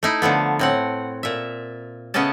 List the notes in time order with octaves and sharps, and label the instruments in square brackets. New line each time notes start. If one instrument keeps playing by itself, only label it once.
[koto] A3 D#4 E4
D3 F3 A3 B3
A2 C4 F#5
A#2 E5
C#3 A3 B3 C#4 D#5 A5